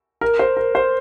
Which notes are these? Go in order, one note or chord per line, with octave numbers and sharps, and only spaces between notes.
A#4
C5
A#4
C5